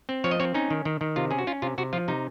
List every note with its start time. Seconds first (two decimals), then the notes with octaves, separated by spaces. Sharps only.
0.09 C4
0.24 F3 C#5
0.31 D#5
0.40 C4 C#5
0.54 C#4 D#4
0.70 D#3
0.85 D#3
1.01 D#3
1.16 C3 F4
1.31 C#4 G#4
1.38 F#4
1.47 C#4 F4
1.62 C3 F4
1.78 C3 F#4
1.93 F3 F4
2.08 C3 D#4